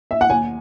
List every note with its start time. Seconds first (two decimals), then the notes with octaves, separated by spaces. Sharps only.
0.11 E5
0.21 F#5
0.30 D#2 G#5